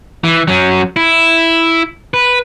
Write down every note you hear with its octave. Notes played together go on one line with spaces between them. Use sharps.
E3
F#3 C#4
E4
B4